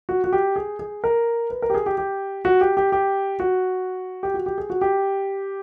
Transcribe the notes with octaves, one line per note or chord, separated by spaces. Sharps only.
F#4
F#4
G4
G#4
G#4
A#4
B4
A#4
G4
G#4
G4
G4
F#4
G4
G4
G4
F#4
G4
F#4
G4
G#4
F#4
G4